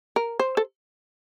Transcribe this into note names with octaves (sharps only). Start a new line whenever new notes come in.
A#4
C5
A4